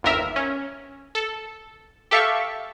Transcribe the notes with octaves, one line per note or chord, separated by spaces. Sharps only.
G1 D#2 A#4 E5
C#4
A4
G4 A4 E5 F5 C#6